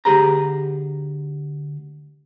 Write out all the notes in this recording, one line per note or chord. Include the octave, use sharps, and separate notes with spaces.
D2 E3 G4 G#4 B4 A#5